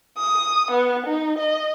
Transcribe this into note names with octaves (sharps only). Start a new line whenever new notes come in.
D#6
B3
D#4
D#5